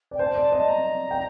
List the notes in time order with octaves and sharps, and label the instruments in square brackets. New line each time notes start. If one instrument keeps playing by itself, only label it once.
[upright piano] D5
[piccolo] G5
[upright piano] C5 [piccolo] A5
[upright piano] D5
[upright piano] D#5 [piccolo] A5
[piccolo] A#5
[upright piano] G5